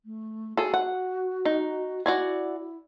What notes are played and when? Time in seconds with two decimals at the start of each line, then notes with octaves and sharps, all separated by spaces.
0.05 A3
0.57 F#4 G#4 A4
0.74 F#5
1.45 D#4
2.06 E4 F#4 D5 G#5